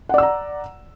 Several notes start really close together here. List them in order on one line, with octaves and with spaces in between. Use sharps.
F#5 D5 E6 A#5